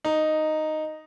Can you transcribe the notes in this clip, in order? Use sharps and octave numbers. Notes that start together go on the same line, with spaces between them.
D#4